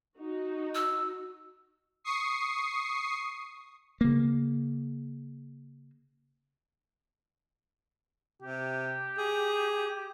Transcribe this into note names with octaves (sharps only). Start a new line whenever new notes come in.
D#4 F#4
E6
C#6 D#6 C7
C#3 A#3
C3 G4
G#4